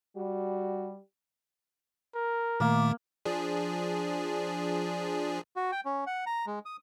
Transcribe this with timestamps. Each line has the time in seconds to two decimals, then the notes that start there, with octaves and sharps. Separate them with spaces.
0.17 G3 F#4
2.15 A#4
2.60 A#2 D#3 A3 A#3
3.25 F3 D4 G#4
5.56 F#4
5.72 G5
5.85 C#4
6.07 F#5
6.26 A#5
6.47 G#3
6.66 D#6